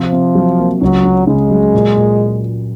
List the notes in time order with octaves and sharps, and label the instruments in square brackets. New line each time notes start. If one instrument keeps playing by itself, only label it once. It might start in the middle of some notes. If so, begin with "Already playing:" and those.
Already playing: [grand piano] C3 [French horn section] F3
[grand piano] C3
F#3
A#3
[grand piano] C#2 [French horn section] F#3
[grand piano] C#4
[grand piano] C#3 [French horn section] G#3
[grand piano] F#3
A#2
A#2